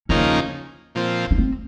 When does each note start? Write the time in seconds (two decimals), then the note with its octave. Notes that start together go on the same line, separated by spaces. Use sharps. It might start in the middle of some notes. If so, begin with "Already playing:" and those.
0.09 D#2 C#3 F3 A#3 C#4 D#4
0.95 A#2 F3 C4
1.31 C#4
1.38 C4